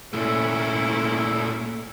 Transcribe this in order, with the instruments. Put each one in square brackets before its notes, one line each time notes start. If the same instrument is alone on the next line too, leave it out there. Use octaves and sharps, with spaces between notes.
[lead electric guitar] A#2 A3 [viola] C#4 E4